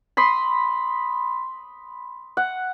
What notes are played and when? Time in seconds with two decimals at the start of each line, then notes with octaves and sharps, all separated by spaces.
0.17 B5 C6 D#6
2.37 F#5